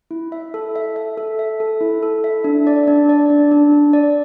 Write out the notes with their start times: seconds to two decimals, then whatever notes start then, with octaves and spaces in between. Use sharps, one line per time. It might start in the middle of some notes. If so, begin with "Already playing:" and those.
0.11 E4
0.32 E5
0.54 A4
0.76 E5
0.96 E5
1.17 A4
1.39 E5
1.60 A4
1.81 E4
2.03 A4
2.24 E5
2.44 D4
2.67 D5
2.87 D4
3.09 D5
3.30 D4
3.52 D4
3.72 D4
3.93 D5